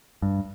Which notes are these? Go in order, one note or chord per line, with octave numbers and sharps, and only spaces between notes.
G2